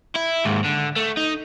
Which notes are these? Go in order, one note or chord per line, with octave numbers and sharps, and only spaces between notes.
E4
D#2 G#2
D3
A3
D#4